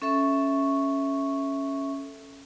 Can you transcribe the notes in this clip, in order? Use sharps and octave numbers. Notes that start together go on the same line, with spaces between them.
C#4 A4 E5 C#6